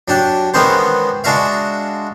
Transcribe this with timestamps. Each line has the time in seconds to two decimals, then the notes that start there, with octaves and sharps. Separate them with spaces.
0.08 F#3 D4 G4
0.54 D#3 E3 G#3 B3 C#4 C5
1.24 G#3 D4 F#4 E5 F5